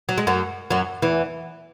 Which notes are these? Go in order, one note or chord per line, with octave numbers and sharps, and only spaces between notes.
F#3
G#3
F#2 F#3
F#2 F#3
E2 E3